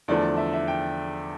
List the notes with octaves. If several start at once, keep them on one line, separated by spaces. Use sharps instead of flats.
E2 D3 F3 A3 D5
E5
E5
G5